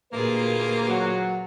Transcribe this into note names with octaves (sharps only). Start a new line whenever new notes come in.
D2 A#2 A#3 F4 G4 G#4 B4
F#3 F#4